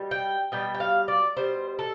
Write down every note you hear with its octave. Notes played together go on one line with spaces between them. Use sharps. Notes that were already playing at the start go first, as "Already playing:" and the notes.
Already playing: B2 G3
G5
B2 G3 G5
G5
F5
D5
B2 G3 C5
A4